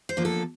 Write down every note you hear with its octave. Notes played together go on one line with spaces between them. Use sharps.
C5
D3 F3 A#3
A4